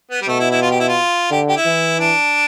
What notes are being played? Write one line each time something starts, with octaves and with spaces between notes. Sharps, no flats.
B3
G3
B2 A3
E4
E4
F4
G4
E4
F4
D3 G4
G4
E4
E3
D4